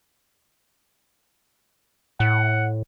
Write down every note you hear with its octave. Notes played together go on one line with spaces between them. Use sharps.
A2 F#5